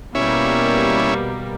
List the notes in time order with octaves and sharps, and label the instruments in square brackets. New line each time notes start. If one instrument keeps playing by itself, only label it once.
[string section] B2 G3 A#3 [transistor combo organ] C#4 E4